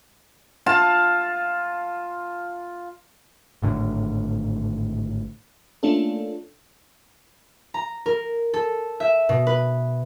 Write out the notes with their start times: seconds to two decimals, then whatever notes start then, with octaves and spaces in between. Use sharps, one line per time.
0.66 F4 F5 A5
3.62 G#1 A2 D3
5.83 A3 A#3 C#4 D4 F4 A4
7.74 A#5
8.06 A#4
8.54 A4
9.00 E5
9.29 B2
9.47 B4